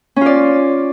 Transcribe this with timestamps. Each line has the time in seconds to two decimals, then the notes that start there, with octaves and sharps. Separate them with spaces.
0.16 C#4
0.21 F4
0.26 D5